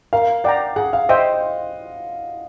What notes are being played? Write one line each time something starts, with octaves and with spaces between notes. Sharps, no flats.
A#4 F5
D5 F#5 G5 A#5
G#4 F#5
F5
C5 D#5 E5 G5